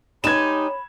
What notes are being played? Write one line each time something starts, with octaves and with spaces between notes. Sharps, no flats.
G#3 D#4 G4 C#5 B5 G#6 E7